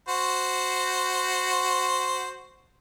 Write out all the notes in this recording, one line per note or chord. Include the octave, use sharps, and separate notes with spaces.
F#4 C5